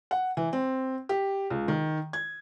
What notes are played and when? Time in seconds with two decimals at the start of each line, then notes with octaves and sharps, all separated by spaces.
0.11 F#5
0.37 E3
0.53 C4
1.09 G4
1.50 C#2
1.68 D#3
2.13 G#6